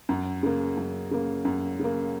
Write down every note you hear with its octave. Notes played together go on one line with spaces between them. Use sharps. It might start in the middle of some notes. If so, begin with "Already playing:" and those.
F#2
C#3 A#3
F#2
C#3 A#3
F#2
C#3 A#3